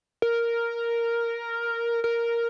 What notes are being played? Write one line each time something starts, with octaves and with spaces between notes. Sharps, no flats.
A#4
A#4